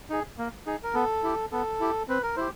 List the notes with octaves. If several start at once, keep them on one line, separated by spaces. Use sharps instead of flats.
D#4 G#4
A#3
D#4 G#4
A#4
B3 A4
E4 G4
B3 A4
E4 G4
C4 B4
A#4
E4 G4 C5